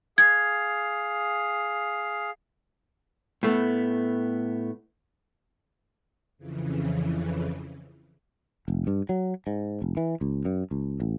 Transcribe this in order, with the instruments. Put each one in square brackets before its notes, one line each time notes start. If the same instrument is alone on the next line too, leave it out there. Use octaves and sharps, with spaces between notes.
[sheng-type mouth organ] G#4 F5 [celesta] G#6
[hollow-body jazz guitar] A2 A3 B3
[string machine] F2 C#3 E3
[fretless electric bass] F1
G2
F#3
G#2
F1
E3
C#2
F#2
C#2
A1